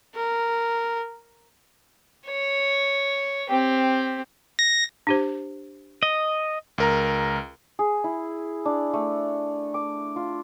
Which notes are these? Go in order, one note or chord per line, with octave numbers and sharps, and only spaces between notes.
A#4
C#5
C4 G4
A#6
D4 G4 C5
D#5
C#2 A#4 A#5
G#4
E4
D4
A3
D6
F4